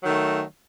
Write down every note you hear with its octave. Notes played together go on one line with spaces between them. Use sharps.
D#3 F#3 A3